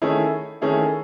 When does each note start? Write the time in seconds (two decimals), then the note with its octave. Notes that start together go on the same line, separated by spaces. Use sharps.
0.02 D#3 A3 C#4 E4 G#4
0.61 D#3 A3 C#4 E4 G#4